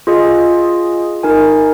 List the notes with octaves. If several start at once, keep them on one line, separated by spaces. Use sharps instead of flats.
F4 G#4 D#5 G#5
D#4 A#4 G#5